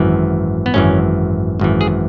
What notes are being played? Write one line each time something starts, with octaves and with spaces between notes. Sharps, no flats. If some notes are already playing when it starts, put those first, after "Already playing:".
Already playing: G#1 F#2 E3
B3
G#1 F#2 E3 C#4
G#1 F#2 E3
G#4